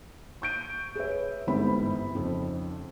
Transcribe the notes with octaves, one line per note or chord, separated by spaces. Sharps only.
C#6 G6 D7 D#7
G#4 B4 C#5 E5
G1 G#2 E3 C4 G4 B5
F2 C#3 C4 D#4